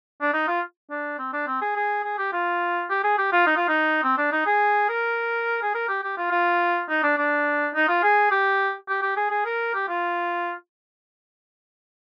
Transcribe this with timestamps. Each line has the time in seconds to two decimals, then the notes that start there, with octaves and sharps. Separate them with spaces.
0.21 D4
0.33 D#4
0.48 F4
0.90 D4
1.19 C4
1.33 D4
1.47 C4
1.62 G#4
1.76 G#4
2.04 G#4
2.18 G4
2.33 F4
2.90 G4
3.04 G#4
3.18 G4
3.32 F4
3.46 D#4
3.57 F4
3.68 D#4
4.03 C4
4.18 D4
4.32 D#4
4.46 G#4
4.89 A#4
5.62 G#4
5.74 A#4
5.88 G4
6.03 G4
6.17 F4
6.31 F4
6.89 D#4
7.03 D4
7.17 D4
7.75 D#4
7.88 F4
8.03 G#4
8.31 G4
8.88 G4
9.02 G4
9.17 G#4
9.30 G#4
9.46 A#4
9.74 G4
9.88 F4